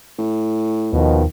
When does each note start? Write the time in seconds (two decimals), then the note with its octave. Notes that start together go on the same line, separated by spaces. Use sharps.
0.18 A2
0.93 D#2 B2 D#3 F3